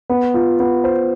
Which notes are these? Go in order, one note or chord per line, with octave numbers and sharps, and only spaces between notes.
B3
F4
B3
C5